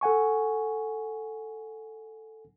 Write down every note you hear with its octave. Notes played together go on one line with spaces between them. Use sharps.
A4 F#5 G#5 C#6